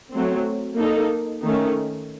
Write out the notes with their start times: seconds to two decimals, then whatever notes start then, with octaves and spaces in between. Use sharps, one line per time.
0.12 F#3 A3 C4
0.78 A#3 D#4 A4
1.44 D#3 A3 C#4